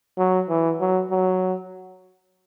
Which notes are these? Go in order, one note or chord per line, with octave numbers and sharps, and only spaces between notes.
F#3
E3
F#3
F#3